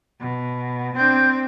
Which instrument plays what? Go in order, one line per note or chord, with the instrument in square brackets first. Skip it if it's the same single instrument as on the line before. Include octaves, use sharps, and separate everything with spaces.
[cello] B2
[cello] C4 D4 [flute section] G6